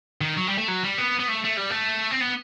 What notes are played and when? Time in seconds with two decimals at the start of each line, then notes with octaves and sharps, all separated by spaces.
0.21 D#3
0.37 F#3
0.47 G3
0.58 A3
0.68 F#3
0.84 G3
0.98 B3
1.20 B3
1.29 A3
1.45 A3
1.58 G3
1.70 A3
2.11 C4
2.21 B3